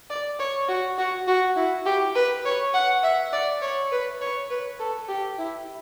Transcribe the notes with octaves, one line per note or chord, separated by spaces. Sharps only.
D5
C#5
F#4
F#4
F#4
E4
G4
B4
C#5
F#5
E5
D5
C#5
B4
C#5
B4
A4
G4
E4